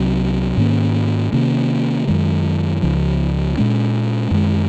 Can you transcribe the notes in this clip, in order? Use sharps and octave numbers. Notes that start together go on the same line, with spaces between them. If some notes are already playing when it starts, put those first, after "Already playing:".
Already playing: C2 C3 F#3 C4
G#2 D#3 A#3 C#4
C3 D#3 A#3 C#4
F#2 D#3 G#3
C#2 C#3 F3
A#2 G#3 C#4
F#2 D#3 G#3